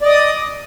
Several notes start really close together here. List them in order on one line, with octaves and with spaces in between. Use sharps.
D5 D#5 D#6